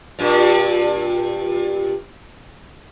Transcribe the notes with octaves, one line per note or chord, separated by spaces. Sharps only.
G2 A#2